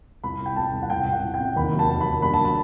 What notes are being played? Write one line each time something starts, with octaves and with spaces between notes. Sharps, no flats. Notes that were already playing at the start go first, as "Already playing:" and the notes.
C2 B5
C2
G5
C2 A5
C2
F#5
C2 G5
C2
F#5
C2
G5
C3
D#2 B5
F#3
A5
D#2
B5
D#2
G2 B5
A5
F#3
B5